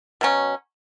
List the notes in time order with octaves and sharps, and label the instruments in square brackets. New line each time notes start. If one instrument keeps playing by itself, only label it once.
[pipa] B2 F#3 C#4